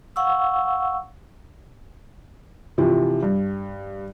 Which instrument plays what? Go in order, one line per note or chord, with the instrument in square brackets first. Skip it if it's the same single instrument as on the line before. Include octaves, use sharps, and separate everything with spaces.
[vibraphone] F5 F#5 C#6 E6
[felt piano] C3 E3 F3
G2